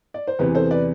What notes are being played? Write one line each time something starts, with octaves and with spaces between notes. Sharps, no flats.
D5
C5
E2 C3 E3 G4 B4
A4 C5
B4 D5